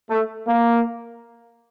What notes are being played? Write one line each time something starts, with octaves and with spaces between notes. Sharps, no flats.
A3
A#3